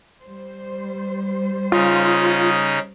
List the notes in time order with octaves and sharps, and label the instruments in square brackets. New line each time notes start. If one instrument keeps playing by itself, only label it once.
[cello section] G3 C5
[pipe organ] C#3 C#4 D#4 [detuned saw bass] F4